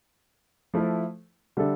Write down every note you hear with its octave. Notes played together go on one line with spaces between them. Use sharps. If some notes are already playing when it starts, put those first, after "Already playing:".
F3 A3 E4
D3 G3 D4 A4 E5